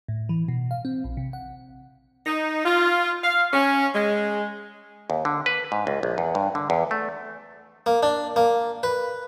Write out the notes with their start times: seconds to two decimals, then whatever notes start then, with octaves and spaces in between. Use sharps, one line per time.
0.08 A2
0.29 E3
0.48 B2
0.71 F5
0.85 C4
1.04 A#1
1.17 C3
1.33 F#5
2.26 D#4
2.65 F4
3.23 F5
3.53 C#4
3.94 G#3
5.10 D#2
5.25 D3
5.46 B4
5.72 G#2
5.87 C#2
6.03 A#1
6.18 E2
6.35 G2
6.55 D3
6.70 E2
6.91 A3
7.86 A#3
8.03 D4
8.36 A#3
8.83 B4